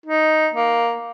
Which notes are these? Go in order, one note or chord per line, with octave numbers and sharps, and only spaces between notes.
D#4
A#3